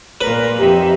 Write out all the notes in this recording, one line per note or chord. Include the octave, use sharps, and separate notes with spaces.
A#2 A#4 B4
F2 D#4 G4 E5